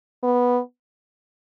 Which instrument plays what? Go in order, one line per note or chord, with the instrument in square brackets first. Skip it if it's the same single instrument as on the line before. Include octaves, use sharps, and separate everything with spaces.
[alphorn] B3